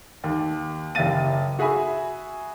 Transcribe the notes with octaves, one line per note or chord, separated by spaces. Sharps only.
D#2
F#1 G4 E5 F5 A6 D#7
F#4 G#4 E5 G#5 B5